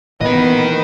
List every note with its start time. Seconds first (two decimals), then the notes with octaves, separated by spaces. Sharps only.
0.21 A#2 E3 B3 A#4 B4 D#5